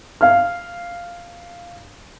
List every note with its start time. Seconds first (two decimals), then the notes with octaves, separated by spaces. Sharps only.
0.21 F5 F6